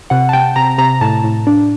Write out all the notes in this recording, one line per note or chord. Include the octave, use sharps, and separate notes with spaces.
C3 F#5
A5
C3 G5
C3 A#5
C3 A#5
A2 A5
A2
D4